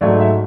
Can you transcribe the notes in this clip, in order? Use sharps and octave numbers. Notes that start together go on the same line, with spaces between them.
G#2 F#3 A3 D5
E5